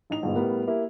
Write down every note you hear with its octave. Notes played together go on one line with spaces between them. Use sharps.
A1 D#4 F7
G1 G#2 B2
A2 G3 B3 A#4
A#3 E4 G4